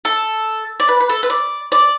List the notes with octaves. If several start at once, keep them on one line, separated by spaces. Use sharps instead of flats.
A4
D5
B4
B4
A4
B4
D5
D5